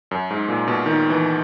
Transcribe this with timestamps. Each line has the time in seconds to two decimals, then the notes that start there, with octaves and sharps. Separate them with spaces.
0.11 F#2
0.30 G#2
0.48 A#2
0.67 B2
0.86 D#3
1.10 E3